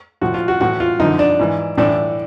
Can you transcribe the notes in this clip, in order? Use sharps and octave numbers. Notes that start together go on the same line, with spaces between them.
A2 F3 F#4
F4
F#4
A2 E3 F#4
F4
F#2 D3 F3 D#4
D4
G#2 E3
A2 E3 D4